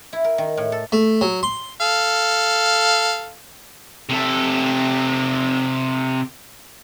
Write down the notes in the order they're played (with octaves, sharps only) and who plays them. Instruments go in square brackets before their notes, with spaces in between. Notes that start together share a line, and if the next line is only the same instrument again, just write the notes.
[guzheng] E4
A#4
D#3
A2
A4
[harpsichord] A3
F#3
C6
[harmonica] A4 F5
[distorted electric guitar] C3 A4